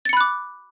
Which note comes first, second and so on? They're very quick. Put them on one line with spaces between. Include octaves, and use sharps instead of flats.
A6 C#7 B5 F#6 D6